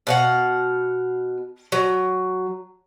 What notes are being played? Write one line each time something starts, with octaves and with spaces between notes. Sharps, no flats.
B2 F5 F#5
F#3